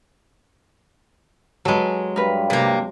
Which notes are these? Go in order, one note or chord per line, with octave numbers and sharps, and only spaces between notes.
F#3 G#3 A4 B4
G2 A#4 B4
C3 A#3